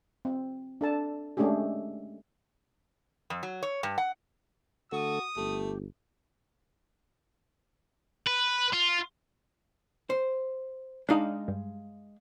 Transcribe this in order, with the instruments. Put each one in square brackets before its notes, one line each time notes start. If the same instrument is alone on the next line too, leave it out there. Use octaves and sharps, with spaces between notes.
[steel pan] C4
D4 A4 A5
G#3 A3 C#4 D4 G4 G#4
[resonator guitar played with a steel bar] F2
F#3
C#5
G2
F#5
[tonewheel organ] D3 A3 A4 [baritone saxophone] F#4 [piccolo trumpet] D#6
[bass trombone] G1 [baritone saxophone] A3 [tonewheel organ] G4
[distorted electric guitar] B4
F4
[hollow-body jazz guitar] C5
[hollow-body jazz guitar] G#3 F5 [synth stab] D4 D#4
[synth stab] G2